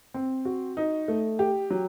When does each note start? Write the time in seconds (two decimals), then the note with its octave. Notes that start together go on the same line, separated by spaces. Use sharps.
0.14 C4
0.45 F#4
0.77 D#4
1.08 A3
1.39 G4
1.70 F#3